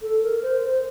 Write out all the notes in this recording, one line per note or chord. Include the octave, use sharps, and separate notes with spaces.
A4
A#4
C5
C5